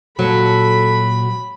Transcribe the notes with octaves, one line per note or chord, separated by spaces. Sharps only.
A#2 F#3 F#4 A4 B5